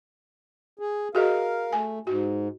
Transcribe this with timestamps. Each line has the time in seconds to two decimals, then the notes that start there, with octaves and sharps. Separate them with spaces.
0.79 G#4
1.15 F#4 G#4 A#4 D#5 F5
1.73 A3 G#5
2.07 G#2 F#4